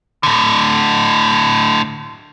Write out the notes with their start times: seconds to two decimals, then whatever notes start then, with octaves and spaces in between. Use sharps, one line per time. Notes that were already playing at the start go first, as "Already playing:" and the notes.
0.23 A2 D3